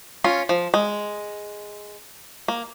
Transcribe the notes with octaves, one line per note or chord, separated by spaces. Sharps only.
C#4 F4
F3
G#3
A#3